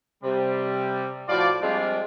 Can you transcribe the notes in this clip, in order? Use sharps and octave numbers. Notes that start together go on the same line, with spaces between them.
C3 G3
A2 F3 F4 F#4 D5
F3 G3 G#3 C4 D4 F4